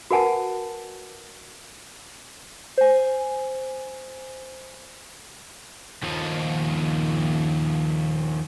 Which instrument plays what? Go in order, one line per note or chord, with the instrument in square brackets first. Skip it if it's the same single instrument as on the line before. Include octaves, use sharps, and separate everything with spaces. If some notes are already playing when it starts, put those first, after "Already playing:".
[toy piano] F#4 A#4 B4 F#5 G#5 A5
[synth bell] C5 G#5
[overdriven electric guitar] D#2 F3